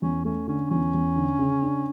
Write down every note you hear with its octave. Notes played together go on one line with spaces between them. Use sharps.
E2 C#4
A3 C#4
D3 C#4
E2 C#4
E2
D3
C#3
D4